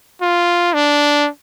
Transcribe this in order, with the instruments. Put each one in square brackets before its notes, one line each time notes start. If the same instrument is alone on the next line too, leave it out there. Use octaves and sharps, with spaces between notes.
[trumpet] F4
D4